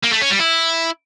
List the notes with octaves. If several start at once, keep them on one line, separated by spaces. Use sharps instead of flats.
A#3
A3
C#4
G3
E4